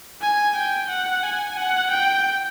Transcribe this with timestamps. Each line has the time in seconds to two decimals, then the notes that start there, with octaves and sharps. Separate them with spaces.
0.21 G#5
0.56 G5
0.90 F#5
1.23 G#5
1.57 F#5
1.91 G5